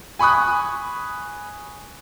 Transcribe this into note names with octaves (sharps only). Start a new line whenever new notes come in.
G#5 B5 C#6 D#6 F#6